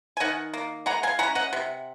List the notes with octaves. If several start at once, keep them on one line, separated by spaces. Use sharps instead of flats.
G#5
D#3 D#5 F#5
A#3
G#3 F#5 A#5
F5 G#5
C#4 F#5 A#5
D#5 F#5
C3